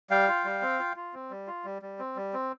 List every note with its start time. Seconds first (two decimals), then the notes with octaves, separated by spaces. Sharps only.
0.10 G3 F5 G5
0.28 F4
0.45 G3
0.62 C4
0.79 F4
0.96 F4
1.14 C4
1.31 G3
1.47 F4
1.65 G3
1.82 G3
1.99 C4
2.16 G3
2.34 C4